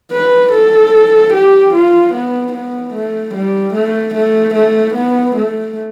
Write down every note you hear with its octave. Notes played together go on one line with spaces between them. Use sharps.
B4
A4
G4
F4
B3
B3
A3
G3
A3
A3
A3
B3
A3